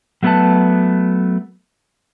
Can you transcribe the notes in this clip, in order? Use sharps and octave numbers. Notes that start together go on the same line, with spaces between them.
F#3 A3 B3 C#4 B4 A5